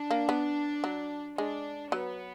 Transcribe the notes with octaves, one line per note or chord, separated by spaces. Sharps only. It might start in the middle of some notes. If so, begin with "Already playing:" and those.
Already playing: D4
A#3
B3
F#3
G#3 D4
F#3 B3